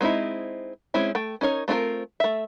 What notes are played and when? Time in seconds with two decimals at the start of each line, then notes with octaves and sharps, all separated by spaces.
0.01 G#3 C4 D#4 E4
0.94 G#3 C4 C#4 E4
1.15 A3 G5
1.41 C#4 D#4 A#4 C#5
1.68 A3 C4 F4 G#4 A#4
2.20 A3 E5